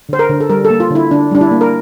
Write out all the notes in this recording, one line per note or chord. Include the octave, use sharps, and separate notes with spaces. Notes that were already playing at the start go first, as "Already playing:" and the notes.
D3 C5
A#4
D3
A4
G3 A#4
A4
A#3
F4
D3 E4
D3 D4
G3 D4
E4
A#3
A#4